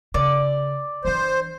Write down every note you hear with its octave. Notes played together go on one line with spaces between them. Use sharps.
C#3 D5
E3 D4 C5